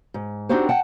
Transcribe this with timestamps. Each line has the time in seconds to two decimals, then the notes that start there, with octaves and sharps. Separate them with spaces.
0.14 G#2
0.49 C4 D4 D#4 F#4 G4 C5
0.69 F#5 G5 A5